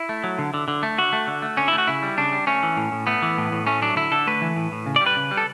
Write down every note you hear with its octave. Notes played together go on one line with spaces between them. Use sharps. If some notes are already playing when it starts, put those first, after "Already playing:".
Already playing: E4
A3
F#3
D3
D3
D3
A3
D3 F#4
A3
D3
A3
D3 C#4
A3 E4
F#4
C#3 E4
G3
C#3 D4
G3
A3 C#4
E3
A2
A2
A3 B3
E3
A2
A2
A3 C#4
F#3 D4
D3 E4
D3 A4
A3 B4
E3
A2
A2
C#3
D5
G3
B4
C#3
G3
A4